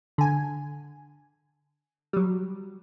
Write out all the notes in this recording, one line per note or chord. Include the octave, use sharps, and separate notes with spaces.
D3 G#5
F#3 G3